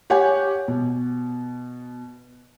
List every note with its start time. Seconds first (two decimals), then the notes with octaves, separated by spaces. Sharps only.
0.10 G4 C#5 F#5 G#5
0.68 B2